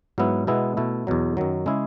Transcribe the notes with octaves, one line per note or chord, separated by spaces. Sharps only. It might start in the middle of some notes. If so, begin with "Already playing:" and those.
G#2 F#3 B3 E4
B2 G#3 B3 E4
B2 A3 E4
E2 B2 F#3
F#2 D#3 F#3
C#3 G#3 C#4 E4 G#4